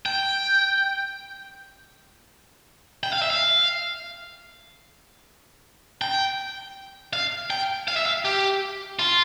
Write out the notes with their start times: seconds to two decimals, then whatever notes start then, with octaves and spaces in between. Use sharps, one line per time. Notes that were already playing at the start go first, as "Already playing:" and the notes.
0.06 G5
3.03 G5
3.13 F5
3.22 E5
3.30 F5
6.02 G5
7.13 F5
7.50 G5
7.88 F5
7.96 E5
8.06 F5
8.25 G4
8.99 F4